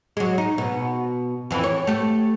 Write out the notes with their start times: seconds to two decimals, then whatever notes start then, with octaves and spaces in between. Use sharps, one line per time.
0.17 F#3 G#3
0.38 D#4
0.58 B2
1.51 F2 E3
1.64 C#5
1.87 A3 G4